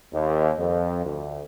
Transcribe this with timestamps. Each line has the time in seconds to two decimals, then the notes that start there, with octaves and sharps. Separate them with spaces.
0.12 D#2
0.57 F2
1.05 D2